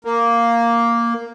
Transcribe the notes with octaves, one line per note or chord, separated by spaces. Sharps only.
A#3